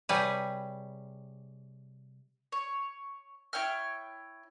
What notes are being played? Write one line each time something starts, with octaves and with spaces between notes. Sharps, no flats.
C3 G3 G#4 B4 C#5
C#5
E4 C#5 G5 F6